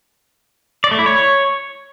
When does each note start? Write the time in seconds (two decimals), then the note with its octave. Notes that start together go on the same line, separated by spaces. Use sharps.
0.84 D5
0.91 A3
0.99 E4
1.06 C#5